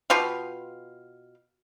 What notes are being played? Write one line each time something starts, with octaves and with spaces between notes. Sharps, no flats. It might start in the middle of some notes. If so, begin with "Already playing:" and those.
B2 F4 G4 F5